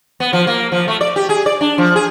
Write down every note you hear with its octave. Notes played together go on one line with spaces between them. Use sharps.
B3
F3
A#3
F3
A3
D5
G4
G#4
D5
D4
F3
G#4